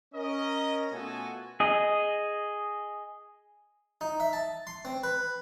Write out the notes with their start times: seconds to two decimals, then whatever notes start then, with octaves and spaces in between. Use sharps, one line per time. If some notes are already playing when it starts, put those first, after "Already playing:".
0.14 C#4 A#4 D#5
0.92 B2 A3 F4 F#4 A4 G#5
1.60 G#4 D#5
4.01 D#4
4.20 E5
4.33 A5
4.67 C6
4.85 C4
5.03 B4